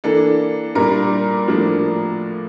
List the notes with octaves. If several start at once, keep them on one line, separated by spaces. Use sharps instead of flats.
E3 A#3 D4 A4
A#2 G3 D4 A#4
A2 F3 A#3 D4